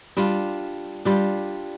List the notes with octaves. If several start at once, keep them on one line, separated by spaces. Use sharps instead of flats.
G3 D4 F4
G3 D4 F4